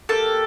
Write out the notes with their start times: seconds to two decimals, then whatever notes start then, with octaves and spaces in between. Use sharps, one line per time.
0.09 A#3 D#4 G4 A4